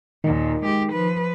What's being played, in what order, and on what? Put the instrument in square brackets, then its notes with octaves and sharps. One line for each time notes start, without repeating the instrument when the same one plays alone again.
[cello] D#2 A#2 [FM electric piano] D#3
[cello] G#3 G4
F3 B4